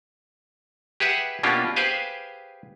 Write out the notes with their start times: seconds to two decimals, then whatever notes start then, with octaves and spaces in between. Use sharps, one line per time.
1.00 G4 G#4 B4 E5 F#5
1.43 B2 A#3 C#4 D4 F4 G4
1.76 G4 G#4 B4 C5 F5 G#5